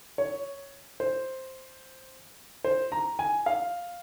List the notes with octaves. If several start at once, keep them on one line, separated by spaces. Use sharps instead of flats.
C#5
C5
C5
A#5
G#5
F5